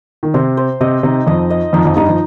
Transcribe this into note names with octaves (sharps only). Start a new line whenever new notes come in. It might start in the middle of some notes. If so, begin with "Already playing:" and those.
D#3
C3 C5
C5
C3 D#5
C3 D#4
F2 F3 D#5
D#5
F2 F3 D#4
F2 F3
G2 G3 D#4
F3